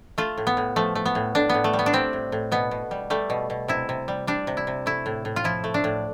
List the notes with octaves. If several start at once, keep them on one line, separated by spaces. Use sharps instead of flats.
A3 F4
A2
B3
A2
F3 A3
A3
B3
A2
A2 D4
A2 B3
A3
G3
B3
D4
G3 C4
A2
A2
B2 B3
B2
G3
G3 A3
B2
B2
C3 E4
C3
G3
G3 D4
C3
E4
C3
A3 E4
A2
A2
F4
F3 E4
A3
D4
A2